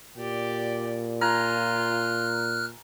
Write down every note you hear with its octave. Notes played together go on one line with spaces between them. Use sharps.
A#2 G4 D5
F4 G#5 A#5 F6 F#6